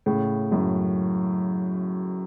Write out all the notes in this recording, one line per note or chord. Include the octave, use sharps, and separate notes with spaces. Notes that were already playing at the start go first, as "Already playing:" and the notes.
A2 C#3
F#2 A2